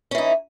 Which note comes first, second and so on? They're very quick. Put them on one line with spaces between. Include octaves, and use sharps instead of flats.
C#4 E3 D#4